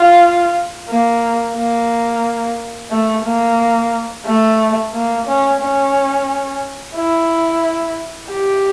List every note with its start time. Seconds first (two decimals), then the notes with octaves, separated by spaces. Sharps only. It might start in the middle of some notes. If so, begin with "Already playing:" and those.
Already playing: F4
0.89 A#3
1.55 A#3
2.91 A3
3.25 A#3
4.25 A3
4.93 A#3
5.27 C#4
5.61 C#4
6.96 E4
8.30 G4